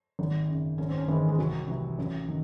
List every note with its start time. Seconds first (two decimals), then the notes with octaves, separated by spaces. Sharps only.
0.19 G#1
0.48 F#2 C#3
0.78 G#1 C#4
0.89 C4
0.98 C#4
1.08 G#2 D#3 E3
1.29 G#3
1.38 C2 F#3
1.67 C3 E3
1.98 A1
2.28 D#3